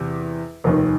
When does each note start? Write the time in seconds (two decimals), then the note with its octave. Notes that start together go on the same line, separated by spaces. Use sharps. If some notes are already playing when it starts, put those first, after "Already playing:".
Already playing: E2 C3
0.64 F1 D#2 D#3